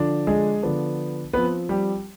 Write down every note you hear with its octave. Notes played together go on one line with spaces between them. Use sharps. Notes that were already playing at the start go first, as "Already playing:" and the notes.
Already playing: D3 F3 D4
G#3 G#4
D3 F3 B3 D4
F3 B3 C4 B4
G3 G4